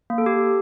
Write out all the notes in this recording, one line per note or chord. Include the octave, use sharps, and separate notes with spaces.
A#3
A4
G4